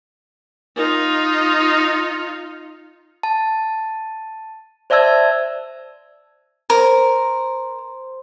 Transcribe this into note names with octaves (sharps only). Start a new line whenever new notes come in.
D#4 F4
A5
C5 D5 E5 A5 E6 G#6
A#4 C5